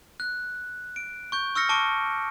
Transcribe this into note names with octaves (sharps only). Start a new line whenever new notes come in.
F#6
D7
C#6 G6
C#6 E6 F6 A#6 C#7
A5 C#6 D6 D7